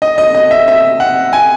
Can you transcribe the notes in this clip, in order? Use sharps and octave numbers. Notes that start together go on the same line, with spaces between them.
D#5
D#5
D#5
E5
E5
F#5
G#5